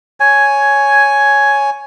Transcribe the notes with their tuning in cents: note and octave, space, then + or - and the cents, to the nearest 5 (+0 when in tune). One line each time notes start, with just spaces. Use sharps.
C#5 +5 G#5 +5